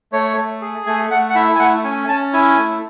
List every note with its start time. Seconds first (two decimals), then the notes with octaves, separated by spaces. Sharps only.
0.12 A3 C#5
0.37 A3
0.62 G#4
0.86 A3 G#5
1.10 A3 F#5
1.30 F#5
1.35 E4 E5
1.55 G#5
1.59 A3 F#5
1.84 C#4 G#5
2.04 G#5
2.09 C#4 A5
2.33 E4 G#5
2.58 A3